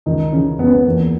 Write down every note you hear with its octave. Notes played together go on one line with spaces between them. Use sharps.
C#2 D#3 D#4
C#3 E3 C#4
C#2 B3
C#4
B3
E2 A#3